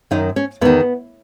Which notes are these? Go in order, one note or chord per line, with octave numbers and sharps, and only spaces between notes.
F#2 D#3 D#4
C#4
E2 D#3 B3